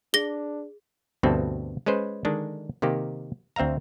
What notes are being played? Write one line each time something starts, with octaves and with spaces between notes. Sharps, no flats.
D4 G#4 A#6 G7
D2 G2 B2 C4 A4
G#3 C#4 B4 C5
D3 D#3 G#3 D4
C3 D#3 A#3 G4
D2 C4 E5 F5 A#5